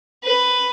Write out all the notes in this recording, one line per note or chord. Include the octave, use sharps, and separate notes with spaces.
B4